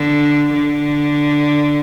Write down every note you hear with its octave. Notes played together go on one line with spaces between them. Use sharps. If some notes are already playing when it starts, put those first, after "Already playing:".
Already playing: D3
D3